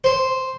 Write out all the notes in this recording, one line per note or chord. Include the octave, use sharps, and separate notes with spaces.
C5